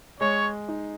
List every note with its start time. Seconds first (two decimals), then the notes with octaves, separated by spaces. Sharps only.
0.20 G#3 C#5
0.68 D#4